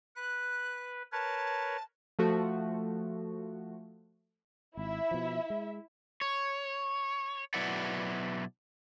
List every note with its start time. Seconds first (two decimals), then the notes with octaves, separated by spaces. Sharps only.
0.16 B4 F#6
1.12 A#4 B4 C#5 A5
2.19 F3 A3 F#4
4.77 G#1 E4 E5
5.11 B2 F3
5.50 G#3
6.21 C#5
7.54 B2 F#3 E4 B4 D5 F#5